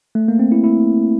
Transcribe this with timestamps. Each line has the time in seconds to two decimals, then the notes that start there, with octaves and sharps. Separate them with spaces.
0.15 A3
0.28 A#3
0.39 C4
0.52 E4
0.64 E4